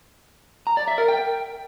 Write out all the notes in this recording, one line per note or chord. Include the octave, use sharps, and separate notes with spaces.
A#5
D5
E5
A#4
G5